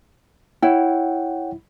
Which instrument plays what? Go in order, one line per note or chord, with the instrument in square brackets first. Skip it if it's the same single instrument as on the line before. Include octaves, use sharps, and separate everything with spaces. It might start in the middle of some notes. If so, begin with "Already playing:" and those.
[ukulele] E4 [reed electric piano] C#5 F#5 G5